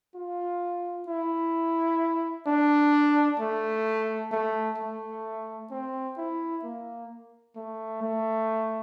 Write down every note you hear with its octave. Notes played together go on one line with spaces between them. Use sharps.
F4
E4
D4
A3
A3
A3
C4
E4
A#3
A3
A3